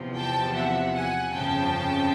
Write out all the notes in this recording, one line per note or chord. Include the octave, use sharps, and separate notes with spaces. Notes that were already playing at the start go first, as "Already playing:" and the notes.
Already playing: E2 C3 F3
G5 A5
E5 F#5
F#5 G#5
G1 F2 C#3 F3 G5 A5